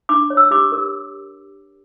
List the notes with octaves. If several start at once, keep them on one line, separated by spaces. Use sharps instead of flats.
D4 D6
C#5
E6
G4 D6
A#4